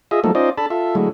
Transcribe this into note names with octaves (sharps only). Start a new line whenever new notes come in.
F4 G#4 D#5 E5
F3 F#3 A3 A#3 D#4 A4
C#4 D#4 F4 C5 D5 D#5
D4 A4 A5 B5
F4 A4 E5
D3 F#3 G#3 A3 E4